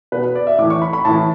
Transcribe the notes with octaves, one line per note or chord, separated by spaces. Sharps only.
B2 B4
D5
E5
A2 E3 D6
C#6
B5
B5
A2 E3 A5